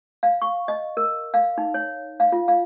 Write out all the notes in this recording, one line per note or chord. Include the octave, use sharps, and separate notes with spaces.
F5
C#6
D#5
A#4
F5
D#4
C#5
F5
F4
F5